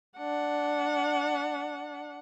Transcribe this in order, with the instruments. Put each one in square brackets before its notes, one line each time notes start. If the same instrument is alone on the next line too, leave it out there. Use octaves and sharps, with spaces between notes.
[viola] D4 F#5